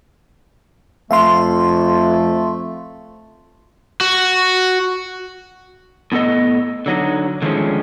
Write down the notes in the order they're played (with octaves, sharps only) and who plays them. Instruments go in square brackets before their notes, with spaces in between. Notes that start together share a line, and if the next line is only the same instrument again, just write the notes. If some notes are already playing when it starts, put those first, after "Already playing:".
[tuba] F2 [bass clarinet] A3 [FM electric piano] E5 F5 C6
[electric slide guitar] F#4
A2 B3 A4 D#5
D3 F#3 D#4
D3 D#3 F3 G#3 A3 C#4